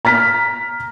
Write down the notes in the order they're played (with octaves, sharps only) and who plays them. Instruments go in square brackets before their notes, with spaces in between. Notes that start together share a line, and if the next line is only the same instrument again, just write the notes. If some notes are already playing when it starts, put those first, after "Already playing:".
[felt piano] A#5 F6 B6